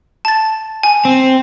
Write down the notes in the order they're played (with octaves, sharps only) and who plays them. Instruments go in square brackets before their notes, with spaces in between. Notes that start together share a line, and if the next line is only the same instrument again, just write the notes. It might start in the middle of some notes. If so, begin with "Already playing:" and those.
[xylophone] A5 A6
G#5
[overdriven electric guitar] C4